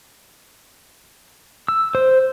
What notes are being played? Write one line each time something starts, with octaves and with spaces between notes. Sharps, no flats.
E6
C5